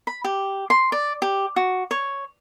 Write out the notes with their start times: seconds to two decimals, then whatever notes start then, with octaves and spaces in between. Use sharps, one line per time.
0.07 B5
0.24 G4
0.70 C6
0.92 D5
1.22 G4
1.56 F#4
1.91 C#5